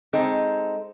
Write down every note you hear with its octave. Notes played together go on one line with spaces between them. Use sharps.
G#3 C4 D#4 A4